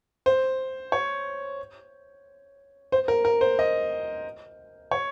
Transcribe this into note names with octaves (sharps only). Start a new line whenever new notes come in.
C5
C#5
C5
A#4
A#4
C5
D#5
C#5